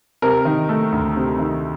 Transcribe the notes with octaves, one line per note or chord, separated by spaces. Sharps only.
C3 A#4
D#3
A3
D2
C3
D#3